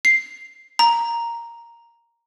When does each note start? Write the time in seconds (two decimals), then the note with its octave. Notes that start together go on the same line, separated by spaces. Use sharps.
0.05 C7
0.79 A#5